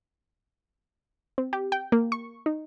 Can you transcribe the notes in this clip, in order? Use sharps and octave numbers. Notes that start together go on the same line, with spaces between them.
C4
G4
G5
A#3
C#6
D#4